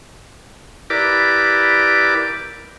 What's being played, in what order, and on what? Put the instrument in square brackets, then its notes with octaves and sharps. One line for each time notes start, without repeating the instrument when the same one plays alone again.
[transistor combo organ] E4 G4 A#4 B4 D5 D6